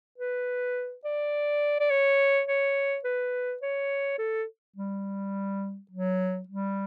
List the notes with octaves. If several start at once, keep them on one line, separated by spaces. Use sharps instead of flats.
B4
D5
D5
C#5
C#5
B4
C#5
A4
G3
F#3
G3